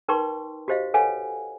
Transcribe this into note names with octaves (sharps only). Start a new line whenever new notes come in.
D#4 A#4 B4 G5 C6 C#6
F#4 G4 C5 D#5 F5
A4 B4 C#5 F5 F#5 G#5